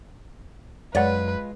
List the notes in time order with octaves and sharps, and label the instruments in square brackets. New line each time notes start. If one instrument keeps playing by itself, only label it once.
[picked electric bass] F#2 [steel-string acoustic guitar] G#3 F4 [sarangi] B4 [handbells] C#5 D5 F#5